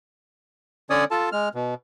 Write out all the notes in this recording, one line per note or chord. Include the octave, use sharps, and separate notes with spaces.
D3 C#4 C#5 D5 D#6
F4 A4 A5
G#3 F6
B2